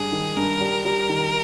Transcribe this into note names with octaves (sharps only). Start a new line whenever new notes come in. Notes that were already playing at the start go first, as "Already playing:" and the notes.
Already playing: G2 G#4
D#3
G2 A#4
G3
G3 A#4
D#3